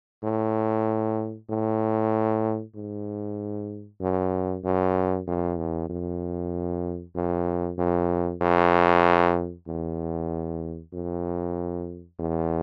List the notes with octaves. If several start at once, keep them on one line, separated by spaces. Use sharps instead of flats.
A2
A2
G#2
F#2
F#2
F2
E2
F2
F2
F2
F2
E2
F2
E2